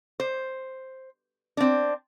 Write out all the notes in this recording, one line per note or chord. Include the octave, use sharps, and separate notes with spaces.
C5
C4 D4